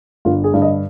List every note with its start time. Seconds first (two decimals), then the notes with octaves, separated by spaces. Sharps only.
0.25 G1 F4
0.44 G#4
0.54 G2 D3
0.62 D#5